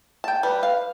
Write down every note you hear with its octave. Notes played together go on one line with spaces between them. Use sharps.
G5 A5
G3 B4
F5